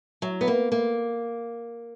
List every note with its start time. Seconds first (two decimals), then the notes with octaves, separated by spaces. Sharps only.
0.22 F#3
0.41 B3
0.48 A#3
0.72 A#3